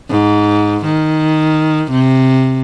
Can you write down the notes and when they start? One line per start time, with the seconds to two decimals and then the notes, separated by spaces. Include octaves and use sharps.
0.10 G#2
0.85 D#3
1.91 C3